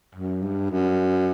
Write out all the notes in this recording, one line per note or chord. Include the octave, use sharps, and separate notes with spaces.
F#2
G2
F#2